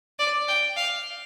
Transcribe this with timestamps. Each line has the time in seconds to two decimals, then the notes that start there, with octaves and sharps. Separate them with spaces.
0.19 D5
0.48 G5
0.77 F5